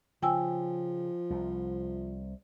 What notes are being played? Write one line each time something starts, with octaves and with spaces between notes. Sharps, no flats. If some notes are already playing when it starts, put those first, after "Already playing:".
C#3 F3 G5 G#5 E6
C2